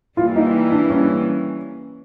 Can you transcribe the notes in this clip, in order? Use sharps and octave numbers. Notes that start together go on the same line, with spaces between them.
E3 G3 A#3 F4
D#4
D4
C#4